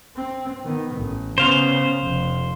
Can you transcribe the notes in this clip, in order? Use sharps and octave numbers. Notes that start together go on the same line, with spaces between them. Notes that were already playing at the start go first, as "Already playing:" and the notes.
C4
D#3 B3
A1
C#3 B3 C5 F5
F1